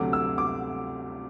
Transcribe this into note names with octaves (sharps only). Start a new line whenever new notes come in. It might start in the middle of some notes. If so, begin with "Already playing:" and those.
Already playing: D2 C3 F#3 A3 D6
E6
D6